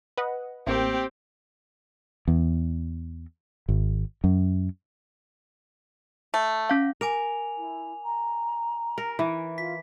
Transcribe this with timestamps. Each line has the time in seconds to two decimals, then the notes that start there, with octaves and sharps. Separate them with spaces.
0.18 B4 D#5 F#5
0.67 A1 A#3 C4 G4
2.28 E2
3.69 G#1
4.24 F#2
6.34 A3
6.70 C#4 F5
7.01 A#4 G#5 D6 F7
7.57 E4
8.05 A#5
8.98 A#4
9.19 E3
9.58 F4 B6